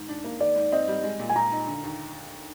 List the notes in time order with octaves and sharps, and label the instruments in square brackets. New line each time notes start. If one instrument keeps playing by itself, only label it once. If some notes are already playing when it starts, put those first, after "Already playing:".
Already playing: [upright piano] G#2 D#3
D4
A#3
[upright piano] D#3 [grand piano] D5
[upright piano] G#2
[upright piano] C4 [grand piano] D#5
[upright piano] G3
G#3
A#2
[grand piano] G#5
[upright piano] A#2 [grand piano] A#5
[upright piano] D#4
D3
D#2